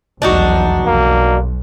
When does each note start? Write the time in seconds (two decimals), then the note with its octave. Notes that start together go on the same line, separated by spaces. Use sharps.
0.22 F1 B1 E2 D4 D#4 F#4
0.86 B1 A#3